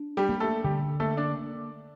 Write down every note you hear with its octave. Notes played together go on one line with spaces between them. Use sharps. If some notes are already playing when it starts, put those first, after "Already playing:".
Already playing: D4
G3 G4
A#3
A3 A4
D3 G3 G4
A3 A#3 A4
D4 D5